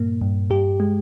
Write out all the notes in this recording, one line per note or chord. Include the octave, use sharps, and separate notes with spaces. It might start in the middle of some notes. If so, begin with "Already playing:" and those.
Already playing: G2 A#2 A#3
G2
G2 G4
G#3